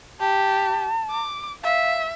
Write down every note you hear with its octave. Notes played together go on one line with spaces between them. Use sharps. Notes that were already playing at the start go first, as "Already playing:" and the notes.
G4 A5
D6
E5 F5